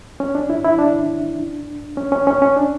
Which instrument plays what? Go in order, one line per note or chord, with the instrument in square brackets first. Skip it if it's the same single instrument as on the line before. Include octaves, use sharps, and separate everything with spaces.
[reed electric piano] C#4
D4
E4
E4
D4
C#4
C#4
C#4
C#4
D4